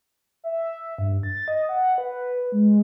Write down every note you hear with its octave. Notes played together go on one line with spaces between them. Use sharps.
E5
G2
A6
D#5
F#5
B4
G#3